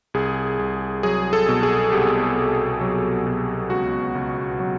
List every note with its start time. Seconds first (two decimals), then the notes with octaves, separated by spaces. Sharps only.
0.14 C2 G#4
0.59 C2
1.03 F#3 G#4
1.33 A4
1.49 B2
1.63 G#4
1.92 C2 G4
2.37 C2
2.81 F#3
3.27 B2
3.70 C#2 F#4
4.15 C#2
4.60 F#3